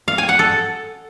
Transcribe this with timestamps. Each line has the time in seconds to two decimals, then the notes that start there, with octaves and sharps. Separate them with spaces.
0.08 F5
0.18 G#5
0.29 F#5
0.39 A4